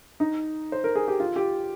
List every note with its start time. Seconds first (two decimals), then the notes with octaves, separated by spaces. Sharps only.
0.20 D#4
0.72 C5
0.84 A#4
0.95 G#4
1.08 G4
1.20 F4
1.36 G4